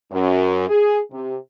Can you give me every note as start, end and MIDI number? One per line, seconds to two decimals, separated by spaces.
0.10 0.67 42
0.68 0.98 68
1.11 1.36 48